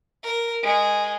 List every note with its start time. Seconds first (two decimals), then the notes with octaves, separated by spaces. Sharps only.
0.23 A#4
0.63 G#3